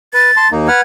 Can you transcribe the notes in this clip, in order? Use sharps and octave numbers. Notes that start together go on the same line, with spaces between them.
B4 A6
A5 C6
D#2 A#3 D#4
B4 F#5 F6 G#6